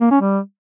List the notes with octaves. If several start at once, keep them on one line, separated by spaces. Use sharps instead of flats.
A#3
C#4
G3